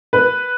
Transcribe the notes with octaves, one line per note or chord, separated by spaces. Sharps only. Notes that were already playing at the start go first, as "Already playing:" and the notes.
B4